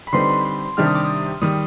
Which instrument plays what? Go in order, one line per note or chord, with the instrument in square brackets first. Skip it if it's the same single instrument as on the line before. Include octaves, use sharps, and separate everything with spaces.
[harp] B5
[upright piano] D3 G3 C4 D#4 B4 [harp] C6
[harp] B5
C6
[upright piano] C3 D#3 G3 D4 G4 [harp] F6
[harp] D#6
D6
D#6
[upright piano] D#3 G3 [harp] D#6